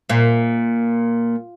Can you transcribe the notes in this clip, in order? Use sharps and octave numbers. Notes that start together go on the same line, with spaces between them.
A#2